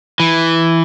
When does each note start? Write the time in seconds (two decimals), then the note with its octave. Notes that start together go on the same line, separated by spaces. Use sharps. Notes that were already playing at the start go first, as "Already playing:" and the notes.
0.20 E3